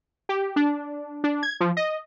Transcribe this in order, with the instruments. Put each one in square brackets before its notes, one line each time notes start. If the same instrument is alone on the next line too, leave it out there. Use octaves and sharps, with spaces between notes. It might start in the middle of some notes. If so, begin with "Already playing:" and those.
[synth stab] G4
D4
D4
G#6
F3
D#5